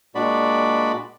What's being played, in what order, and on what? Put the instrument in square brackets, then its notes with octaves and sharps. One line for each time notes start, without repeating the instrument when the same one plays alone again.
[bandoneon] A#2 G#3 D4 F#4 D5 B5